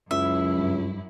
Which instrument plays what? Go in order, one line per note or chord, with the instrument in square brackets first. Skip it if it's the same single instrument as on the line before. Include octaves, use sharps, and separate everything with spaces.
[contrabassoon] C#2 [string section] F#2 E4 [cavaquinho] E5
[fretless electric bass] G2